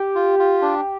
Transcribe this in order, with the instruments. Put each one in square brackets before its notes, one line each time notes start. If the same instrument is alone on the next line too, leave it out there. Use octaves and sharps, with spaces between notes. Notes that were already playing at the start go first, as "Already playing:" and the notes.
Already playing: [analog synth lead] G4
[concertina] F4
F4
D4